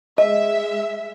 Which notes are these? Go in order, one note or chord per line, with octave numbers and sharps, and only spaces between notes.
G#3 D#5 E5